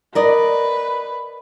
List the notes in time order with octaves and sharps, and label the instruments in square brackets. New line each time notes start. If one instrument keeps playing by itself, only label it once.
[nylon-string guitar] A#4 D5 D#5 [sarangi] B4